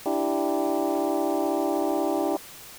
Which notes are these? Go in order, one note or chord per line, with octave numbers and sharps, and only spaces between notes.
D4 E4 G4